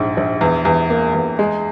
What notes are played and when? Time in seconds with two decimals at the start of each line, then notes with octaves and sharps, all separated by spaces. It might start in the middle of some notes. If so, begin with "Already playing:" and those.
Already playing: A#1 G#2
0.17 A#1
0.41 E2
0.65 E2
0.90 A#3
1.14 E2
1.39 G#3